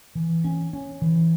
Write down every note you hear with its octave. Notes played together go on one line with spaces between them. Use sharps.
E3
C#4
C#4
E3